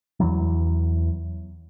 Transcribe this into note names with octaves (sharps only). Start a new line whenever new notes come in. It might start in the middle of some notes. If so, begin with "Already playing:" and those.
E2 E3 F#3